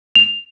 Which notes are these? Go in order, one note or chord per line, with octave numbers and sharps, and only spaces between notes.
F7